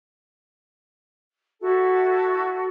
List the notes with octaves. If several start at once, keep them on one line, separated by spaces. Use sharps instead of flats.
E4 F#4 A4